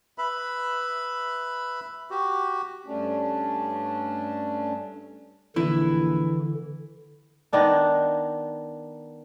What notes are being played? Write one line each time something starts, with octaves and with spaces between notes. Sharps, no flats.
B4 E5 B5
F#4 G4
G2 A3 C#4 D4
A#1 D3 E3 E4 E5
D#3 B3 D4 D#4